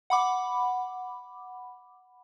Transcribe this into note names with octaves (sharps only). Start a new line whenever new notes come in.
F#5 B5 D6